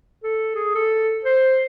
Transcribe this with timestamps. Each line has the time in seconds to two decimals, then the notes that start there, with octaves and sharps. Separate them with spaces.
0.23 A4
0.55 G#4
0.75 A4
1.25 C5